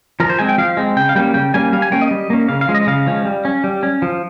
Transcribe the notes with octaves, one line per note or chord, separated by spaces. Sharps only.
F3 A#4
C5
G#3 C4 G#5
G5
F3 F5
G#3 C4
C#3 G5
F5
G3 A#3 C#4 G5
C#3 G5
G3 A#3 C#4 G#5
G3 F5
G#5
A#3 C#4 G5
D#5
G3
A#3 C#4
C#3 F5
F5
F3 G#3 C#4
D#5
C#3 F5
F3 G#3 C#4
G3
C#4
G3
C#4
F3